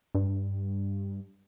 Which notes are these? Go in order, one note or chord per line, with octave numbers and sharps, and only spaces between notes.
G2